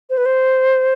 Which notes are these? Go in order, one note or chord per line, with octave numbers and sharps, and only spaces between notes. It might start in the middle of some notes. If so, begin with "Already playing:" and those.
C5
B4
C5